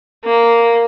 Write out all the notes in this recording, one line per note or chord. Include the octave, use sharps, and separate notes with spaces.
A#3